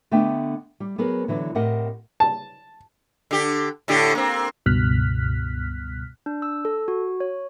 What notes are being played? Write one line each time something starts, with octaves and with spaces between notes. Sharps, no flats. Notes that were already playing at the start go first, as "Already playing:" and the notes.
D3 A3 B3 D4 D#5 G5
G3
F#3 B3 G#4 A#4
D3 E3 F#3 D4
A2 C4 G4 A#4 D#5 F#5
A5
D3 G4
A2 D3 G4
A#3 C4
C#2 G2 B2 F6 F#6 B6
D4
E6
A4
F#4
C#5